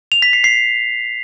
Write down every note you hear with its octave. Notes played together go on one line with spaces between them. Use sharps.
F7
B6
C7
C7